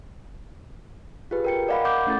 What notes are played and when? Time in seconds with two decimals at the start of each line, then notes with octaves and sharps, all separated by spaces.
1.31 F4 G4 G#4 B4
1.45 A#4 G5 C#7
1.68 A#4 D5 D#5 F5 F#5 B5
1.85 F#5 D6 G6
2.07 A3 C#4 E4 A4 A6